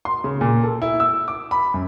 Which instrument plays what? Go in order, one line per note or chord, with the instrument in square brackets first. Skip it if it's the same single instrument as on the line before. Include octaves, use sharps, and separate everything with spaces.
[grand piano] C6
C#3
A#2
A4
E4
E6
D6
B5
F#2